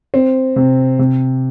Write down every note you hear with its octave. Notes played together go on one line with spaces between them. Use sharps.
C4
C3
C3